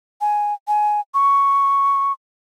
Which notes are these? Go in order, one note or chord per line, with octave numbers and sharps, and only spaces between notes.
G#5
G#5
C#6